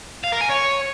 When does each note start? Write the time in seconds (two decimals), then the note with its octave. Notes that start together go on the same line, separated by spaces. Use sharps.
0.24 F5
0.32 A#4
0.41 G#5
0.49 C#5